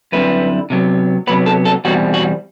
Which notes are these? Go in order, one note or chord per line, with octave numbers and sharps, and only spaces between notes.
F#2 D3 G3 C4 E4 B4
C3 F#3 B3
C3 F#3 B3 B4
A4
A4
E2 B2 G3 C4 F#4
F#4